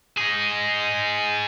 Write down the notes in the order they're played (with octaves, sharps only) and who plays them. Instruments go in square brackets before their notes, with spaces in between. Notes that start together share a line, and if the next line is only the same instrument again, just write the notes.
[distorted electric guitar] D#4 G#4